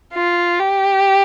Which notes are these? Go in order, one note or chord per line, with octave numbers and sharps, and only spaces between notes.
F4
G4